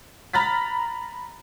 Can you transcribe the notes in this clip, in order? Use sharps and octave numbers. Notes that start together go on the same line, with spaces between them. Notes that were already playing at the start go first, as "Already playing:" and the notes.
A#5 B5 F6 A6 B6